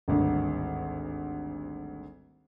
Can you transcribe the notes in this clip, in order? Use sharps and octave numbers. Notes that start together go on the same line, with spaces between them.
G#1 D2 G2